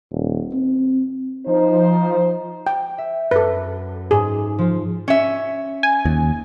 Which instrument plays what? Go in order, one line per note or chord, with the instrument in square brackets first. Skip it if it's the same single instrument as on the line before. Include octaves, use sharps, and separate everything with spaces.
[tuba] D#1
C4
[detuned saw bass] F3 [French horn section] D#4 C5
[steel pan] G5
[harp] E5
[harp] F#2 [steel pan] A4 B4
[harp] G#2 [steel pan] G#4
[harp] F3 F4
[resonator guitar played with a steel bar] C#4 E5
[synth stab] G#5
[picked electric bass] D#2